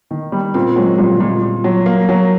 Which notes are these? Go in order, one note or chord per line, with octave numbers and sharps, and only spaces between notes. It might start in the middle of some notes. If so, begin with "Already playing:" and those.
D#3
G3
A#2 A#3 C4
F#3 G#3
A#2 G3
A#2 G#3
A#2
F#3
A#3
F#3